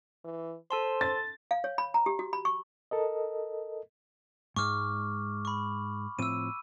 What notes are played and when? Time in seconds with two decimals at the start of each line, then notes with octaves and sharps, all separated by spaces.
0.24 E3
0.71 A4 C5 A5 C6
1.01 A6
1.51 F5
1.64 C#5
1.78 B5
1.94 A#5
2.06 G4
2.19 F#4
2.33 B5
2.45 C#6
2.91 A4 A#4 D#5
4.56 G#2 G#3 C#6 D6 F6
5.45 B5 C#6
6.19 A2 F3 C4 E6 D#7